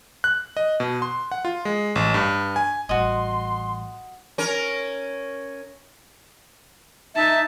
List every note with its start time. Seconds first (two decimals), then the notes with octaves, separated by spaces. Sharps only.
0.24 F#6
0.57 D#5
0.80 B2
1.02 C6
1.31 F#5
1.45 F4
1.65 G#3
1.96 A1
2.14 G2
2.56 G#5
2.89 A1 G3 F#4 D#5 C6
4.38 C#4 A#4
7.17 D#4 E5 A5